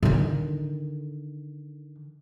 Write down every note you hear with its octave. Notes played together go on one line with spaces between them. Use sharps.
D3 D#3